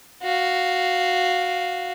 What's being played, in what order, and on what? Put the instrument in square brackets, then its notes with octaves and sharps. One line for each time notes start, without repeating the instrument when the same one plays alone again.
[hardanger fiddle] F#4 F5